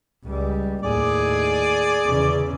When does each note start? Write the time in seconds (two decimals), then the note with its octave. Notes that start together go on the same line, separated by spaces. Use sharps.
0.25 C#2 G3
0.83 D#2 A2 G#4 D5
2.06 E2 C#3